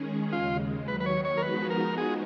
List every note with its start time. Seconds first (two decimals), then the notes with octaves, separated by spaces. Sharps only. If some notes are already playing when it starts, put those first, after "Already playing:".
Already playing: D#3 G#3 C#4 G#4
0.32 D#2 C#3 G#3 F4
0.87 D#2 D#3 F#3 B4
1.00 B4
1.06 C#5
1.25 C#5
1.37 A#4
1.42 F3 G#3 B3 D#4 F#4 B4
1.70 A#4
1.98 G#4